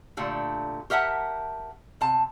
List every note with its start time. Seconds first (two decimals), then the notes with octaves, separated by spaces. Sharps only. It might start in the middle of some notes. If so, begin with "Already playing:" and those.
0.17 A#2 D3 A3 G4
0.90 G4 A#4 E5 F#5 A5
2.01 C3 A5